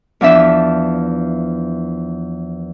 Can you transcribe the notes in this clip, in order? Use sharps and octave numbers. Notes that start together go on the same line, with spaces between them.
E2 F3 D4 E5